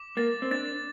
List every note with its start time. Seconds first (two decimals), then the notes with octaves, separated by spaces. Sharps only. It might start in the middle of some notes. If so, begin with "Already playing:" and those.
Already playing: D6
0.17 A#3 A6
0.42 C4
0.51 D4 A6